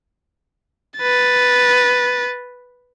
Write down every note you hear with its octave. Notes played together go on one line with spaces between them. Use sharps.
B4 A6